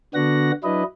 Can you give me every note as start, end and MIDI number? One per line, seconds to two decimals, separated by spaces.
0.14 0.52 50
0.14 0.52 59
0.14 0.52 62
0.14 0.52 66
0.14 0.52 78
0.14 0.52 94
0.64 0.83 54
0.64 0.83 62
0.64 0.83 64
0.64 0.83 71
0.64 0.83 75